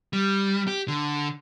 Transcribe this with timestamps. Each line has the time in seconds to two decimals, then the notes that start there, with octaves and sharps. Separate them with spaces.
0.13 G3
0.68 G4
0.88 D3